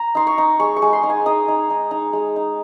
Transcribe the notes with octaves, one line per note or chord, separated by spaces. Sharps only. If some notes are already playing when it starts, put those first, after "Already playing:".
Already playing: A#5
D#4 C6
C#6
D#4
G#3 C#6
C#6
G#3
C6
D#4
G#5
D#4 D#6
D#4
D#4
D#4
G#3
D#4